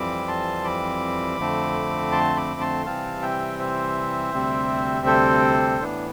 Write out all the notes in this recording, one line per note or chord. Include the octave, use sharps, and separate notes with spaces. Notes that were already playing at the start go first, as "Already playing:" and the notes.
Already playing: F2 E3 G3 C4 B5 D6
A5 C6
B5 D6
F2 D3 A3 C4
A5 C6
B5 D6
A5 C6
C3 E3 G3 C4 F5 A5
E5 G5
C5 E5
D2 C3 G3 C4
A4 C5
A2 E3 B3 D4